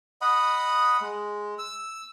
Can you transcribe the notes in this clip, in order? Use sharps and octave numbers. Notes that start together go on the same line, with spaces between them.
D#5 F#5 B5 D#6
G#3
E6